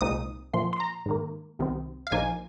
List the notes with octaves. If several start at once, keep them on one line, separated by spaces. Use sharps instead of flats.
C2 A#2 G#3 C4 D#4 D#6
A#2 F3 A#3 C6
C6
A#5
G#2 D#3 A#3
C2 C3 D#3 C4
F5
A#1 A#2 F3 A#3 D#4 G#5